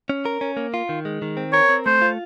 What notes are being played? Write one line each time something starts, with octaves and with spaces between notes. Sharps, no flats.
C#4
A#4
C#4
A#3
F4
D#3
G#3
D#3
C4
A#4 C#5
C4
A3 C5
F4